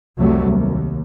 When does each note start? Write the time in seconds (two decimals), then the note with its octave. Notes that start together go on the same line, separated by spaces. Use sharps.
0.18 C2 F2 C3 F#3 G3 A3
0.48 D#2